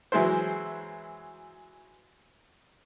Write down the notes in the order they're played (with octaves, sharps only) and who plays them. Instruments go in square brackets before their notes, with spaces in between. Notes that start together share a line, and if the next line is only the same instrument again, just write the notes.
[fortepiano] E3 F#3 G#3 E4 C5